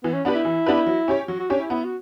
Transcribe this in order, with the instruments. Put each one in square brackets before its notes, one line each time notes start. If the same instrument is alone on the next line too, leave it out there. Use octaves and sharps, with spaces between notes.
[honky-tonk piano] E3 [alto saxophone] B3
[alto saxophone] C#4
[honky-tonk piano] B3 D4 G4 B4
[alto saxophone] E4
[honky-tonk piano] E3
B3 D4 G4 B4
F#3
C#4 G4 C#5
[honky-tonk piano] F#3 [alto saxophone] F#4
[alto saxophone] F#4
[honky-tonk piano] C#4 G4 C#5 [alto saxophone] D4
[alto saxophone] E4
[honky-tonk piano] B3 [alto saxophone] E4
[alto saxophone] F#4